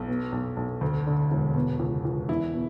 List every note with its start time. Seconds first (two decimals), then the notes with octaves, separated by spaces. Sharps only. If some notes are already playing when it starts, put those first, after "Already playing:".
Already playing: B1
0.08 B2
0.32 B1
0.57 B1
0.81 D2
1.07 D3
1.31 E1
1.55 B2
1.79 C#2
2.05 C#2
2.28 E2 E4
2.54 B2